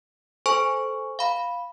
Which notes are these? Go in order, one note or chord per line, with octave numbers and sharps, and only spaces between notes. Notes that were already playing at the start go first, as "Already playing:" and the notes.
A4 C5 G#5 C#6
F5 B5